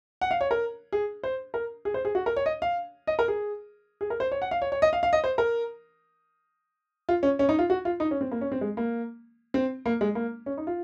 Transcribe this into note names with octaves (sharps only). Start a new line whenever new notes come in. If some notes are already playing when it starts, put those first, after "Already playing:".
F#5
F5
C#5
A#4
G#4
C5
A#4
G#4
C5
G#4
F#4
A#4
C#5
D#5
F5
D#5
A#4
G#4
G#4
A#4
C5
C#5
F#5
F5
C#5
C#5
D#5
F5
F5
D#5
C5
A#4
F4
C#4
C#4
D#4
F4
F#4
F4
D#4
C#4
C4
A#3
C#4
C4
G#3
A#3
C4
A#3
G#3
A#3
C#4
D#4
F4